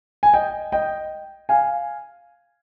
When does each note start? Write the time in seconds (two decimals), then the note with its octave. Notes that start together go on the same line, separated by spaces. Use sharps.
0.23 G#5
0.33 D#5 G5
0.72 D#5 G5
1.49 F5 G#5